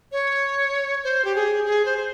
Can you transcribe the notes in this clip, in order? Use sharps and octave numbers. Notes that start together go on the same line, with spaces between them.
C#5
C5
G4
G#4
G#4
C5
C5